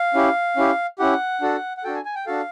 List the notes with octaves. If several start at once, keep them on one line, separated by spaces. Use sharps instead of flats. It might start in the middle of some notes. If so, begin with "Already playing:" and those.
Already playing: F5
C#4 E4 G4
C#4 E4 G4
C#4 E4 G4 F#5
D4 F#4 A4
F#5
D4 F#4 A4 G5
G#5
G#5
G5
D4 F#4 A4 F5